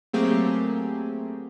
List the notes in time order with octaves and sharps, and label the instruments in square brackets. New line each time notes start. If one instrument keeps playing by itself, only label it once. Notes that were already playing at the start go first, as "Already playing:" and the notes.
[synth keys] F#3 A3 A#3 C4 G4 G#4